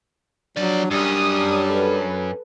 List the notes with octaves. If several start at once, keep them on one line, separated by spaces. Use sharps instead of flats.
F3 F#3 D4 D5
F#2 G3 C#4 D#6
A4 B4